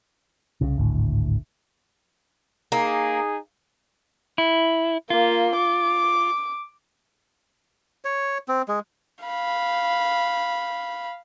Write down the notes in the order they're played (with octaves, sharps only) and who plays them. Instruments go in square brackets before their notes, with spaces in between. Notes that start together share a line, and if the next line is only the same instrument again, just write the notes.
[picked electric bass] C2 C#3
G#1 D2 A2 D3
[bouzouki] A#3 [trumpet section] D#4 G#4
[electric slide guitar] E4
[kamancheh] A#3 [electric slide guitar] F4
[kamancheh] D6
[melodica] C#5
C4
G#3
[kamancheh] F5 B5